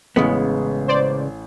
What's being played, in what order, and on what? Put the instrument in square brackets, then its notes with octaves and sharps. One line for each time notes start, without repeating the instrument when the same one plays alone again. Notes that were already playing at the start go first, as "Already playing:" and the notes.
[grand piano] A1 [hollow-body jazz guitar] C#3 G#3 B3
[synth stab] C5 D5